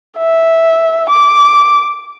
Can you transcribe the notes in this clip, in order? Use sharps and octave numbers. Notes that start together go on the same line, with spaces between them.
E5
D6